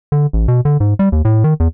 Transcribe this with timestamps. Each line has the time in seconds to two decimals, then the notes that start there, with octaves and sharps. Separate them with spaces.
0.12 D3
0.33 A1
0.48 B2
0.65 D3
0.80 G#2
0.99 G3
1.12 D#2
1.25 A2
1.44 D#3
1.60 E2